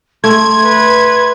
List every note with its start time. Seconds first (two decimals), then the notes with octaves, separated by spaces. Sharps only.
0.24 A3 C6 G#6
0.64 B4